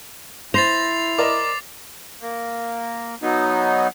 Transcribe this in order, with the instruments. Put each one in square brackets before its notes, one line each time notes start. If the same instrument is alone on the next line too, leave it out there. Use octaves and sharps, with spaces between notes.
[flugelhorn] E4 [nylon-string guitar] C5 [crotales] A6 C7 F7 [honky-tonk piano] A#6
[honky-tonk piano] A#4 D5 D#5 [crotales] D6
[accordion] A#3
F#3 B3 D#4